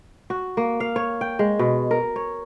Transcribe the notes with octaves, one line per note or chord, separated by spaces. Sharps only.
F#4
A#3
F5
C#5
G5
G#3
B2
A#4
C#5